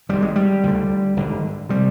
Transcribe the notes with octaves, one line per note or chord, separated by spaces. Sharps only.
G#1 G#2 G3
G#3
G3
D2 D3
G#1 G2 D3
C3 G3